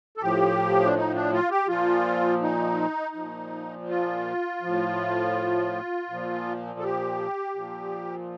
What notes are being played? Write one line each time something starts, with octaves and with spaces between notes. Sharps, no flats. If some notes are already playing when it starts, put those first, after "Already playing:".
A4
A2 F3 G4
D4
D#4
D4
F4
G4
A#2 F3 F4
D#4
A#2 F3
F4
A2 F3
A#2 F3
A4
G4
A#2 F3